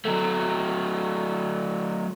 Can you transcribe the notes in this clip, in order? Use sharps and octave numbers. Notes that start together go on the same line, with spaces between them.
F#3 A3